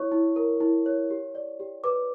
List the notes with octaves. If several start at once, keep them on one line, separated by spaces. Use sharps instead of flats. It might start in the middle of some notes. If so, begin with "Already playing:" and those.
Already playing: E4 C#5 C#6
E4
A#4
E4
C#5
G4
D5
G4
B4 D6